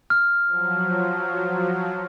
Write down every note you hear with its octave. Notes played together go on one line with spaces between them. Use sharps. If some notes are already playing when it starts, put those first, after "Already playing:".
F6
F3 F#3